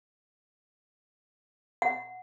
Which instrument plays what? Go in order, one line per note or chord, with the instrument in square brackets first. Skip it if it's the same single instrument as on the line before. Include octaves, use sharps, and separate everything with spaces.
[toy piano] F#5